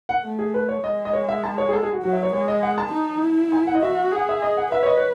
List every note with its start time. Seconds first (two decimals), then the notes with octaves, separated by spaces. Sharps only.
0.09 F#5
0.23 A3
0.39 G#4
0.54 B4
0.69 C#5
0.83 G#3 D#5
1.05 D#5
1.13 C#5
1.29 E5
1.44 A5
1.58 C#5
1.69 G#4
1.73 A4
1.83 G#4
1.93 F#4
2.03 F#3 F#4
2.13 E5
2.23 C#5
2.33 G#3 C#5
2.48 D#5
2.63 F#5
2.78 A5
2.92 D#4
3.22 E4
3.52 G#5
3.67 F#5
3.75 D#5
3.82 F#4 E5
4.12 G#4 F#5
4.29 E5
4.42 D#5
4.57 F#5
4.72 B4 E5
4.83 C#5
4.86 D#5
4.97 C#5